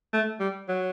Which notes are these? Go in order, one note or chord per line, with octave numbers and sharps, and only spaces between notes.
A3
G3
F#3